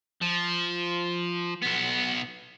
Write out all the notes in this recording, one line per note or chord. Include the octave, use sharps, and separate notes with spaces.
F3
B1 B3